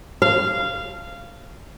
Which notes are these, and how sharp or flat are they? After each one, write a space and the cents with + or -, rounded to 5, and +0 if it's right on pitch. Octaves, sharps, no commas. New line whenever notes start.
F5 -15